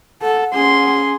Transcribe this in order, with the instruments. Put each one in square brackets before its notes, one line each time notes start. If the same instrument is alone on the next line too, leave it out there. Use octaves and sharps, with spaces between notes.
[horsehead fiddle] A4 [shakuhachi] F#5
[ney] C#4 [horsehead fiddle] G#4 [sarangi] C6